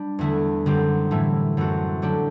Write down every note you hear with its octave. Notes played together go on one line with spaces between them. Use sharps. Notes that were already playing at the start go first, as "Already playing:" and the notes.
Already playing: G3 D4
E2 D3 A3 E4
F#2 D3 G3 C4 G4
A2 E3 A3 E4
F#2 E3 A3 C4 F#4
D3 F#3 A3 D4 G4